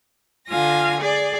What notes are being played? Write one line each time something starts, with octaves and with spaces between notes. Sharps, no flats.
D3 F4 F5 G#5 A#6
G#4 D5